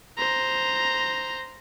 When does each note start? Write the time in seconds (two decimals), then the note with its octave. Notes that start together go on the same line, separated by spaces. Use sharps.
0.18 C5 A#5